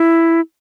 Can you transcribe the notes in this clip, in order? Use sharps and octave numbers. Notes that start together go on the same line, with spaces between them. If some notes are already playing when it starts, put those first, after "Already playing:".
Already playing: E4